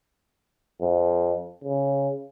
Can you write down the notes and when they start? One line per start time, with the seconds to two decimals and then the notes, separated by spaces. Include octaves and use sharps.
0.81 F2
1.64 C#3